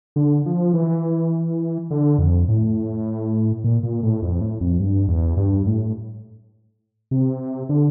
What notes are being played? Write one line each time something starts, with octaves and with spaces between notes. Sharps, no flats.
D3
F3
E3
D3
F2
A2
A#2
A#2
A2
F2
A2
F2
G2
E2
G2
A2
C3
D3